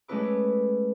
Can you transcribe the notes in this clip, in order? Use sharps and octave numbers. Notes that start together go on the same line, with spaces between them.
G#3 A3 C#4 E4 B4 D6